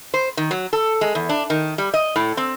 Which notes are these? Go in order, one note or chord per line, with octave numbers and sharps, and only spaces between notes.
C5
D#3
F#3
A4
G#3
E2
D4
D#3
G3
D#5
A2
C4